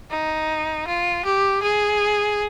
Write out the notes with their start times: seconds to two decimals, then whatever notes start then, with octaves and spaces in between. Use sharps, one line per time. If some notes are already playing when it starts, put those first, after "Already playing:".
0.10 D#4
0.87 F4
1.25 G4
1.63 G#4